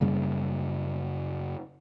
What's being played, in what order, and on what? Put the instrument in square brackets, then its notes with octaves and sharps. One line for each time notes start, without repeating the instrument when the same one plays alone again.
[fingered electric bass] F#2 C#3 G3 A#3